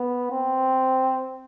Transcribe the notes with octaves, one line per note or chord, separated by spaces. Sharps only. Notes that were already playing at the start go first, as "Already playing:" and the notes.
Already playing: B3
C4